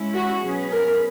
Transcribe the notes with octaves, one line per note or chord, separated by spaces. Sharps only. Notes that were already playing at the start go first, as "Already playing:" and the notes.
Already playing: G#3 C#4 E4
F#4
B2 F#3 C#4 G#4 B4
A#4